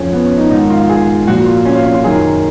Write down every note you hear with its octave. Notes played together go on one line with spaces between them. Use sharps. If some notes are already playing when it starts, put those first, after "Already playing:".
Already playing: F2 F3 C#4
B3
C#4
D#4
G#2 D#3 D#4
F4
G#4
A#2 F3 F#4
F4
C#4
F4
C#4
F4
F#2 D#3 G#4